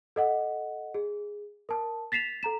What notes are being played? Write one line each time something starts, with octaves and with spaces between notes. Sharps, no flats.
A4 D#5 F#5
G#4
A#4 A5
A6 B6 C7 E7 F7
A4 A#5 E7